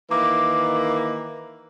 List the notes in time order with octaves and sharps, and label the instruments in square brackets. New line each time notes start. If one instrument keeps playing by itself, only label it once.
[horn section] D#3 E3 A#3 [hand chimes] D6